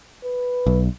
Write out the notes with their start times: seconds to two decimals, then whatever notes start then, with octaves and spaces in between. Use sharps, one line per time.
0.24 B4
0.67 B1